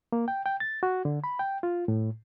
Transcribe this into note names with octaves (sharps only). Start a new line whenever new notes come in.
A#3
G5
G5
A6
F#4
D3
B5
G5
F4
A2